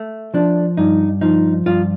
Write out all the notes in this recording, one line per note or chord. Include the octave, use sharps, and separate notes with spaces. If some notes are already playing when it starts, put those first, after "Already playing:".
Already playing: A3
F3 D4
G2 D#4
F3 D#4
G2 F4